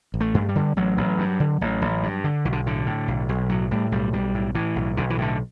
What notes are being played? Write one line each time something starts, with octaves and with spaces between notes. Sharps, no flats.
A1
A3
G2
G3
D3
A1 F#3
A1
G2
D3
A1
A1
G2
D3
B1 E3
D3
A2 D3
A2
B1
B1
A2 F#3
A2 G3
B1 G3
B1 G3
A2
A2 E3
B1
B1 D3
E3
A2 D3